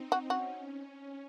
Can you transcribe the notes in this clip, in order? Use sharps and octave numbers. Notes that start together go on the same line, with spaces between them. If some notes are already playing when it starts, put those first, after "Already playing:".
Already playing: C4 D#4
F#4
C#4 F#4
C#4